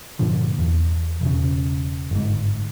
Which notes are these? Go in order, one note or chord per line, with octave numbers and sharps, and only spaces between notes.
G2 A#2 D3 F3
E2
E1 C#3
G1 G#2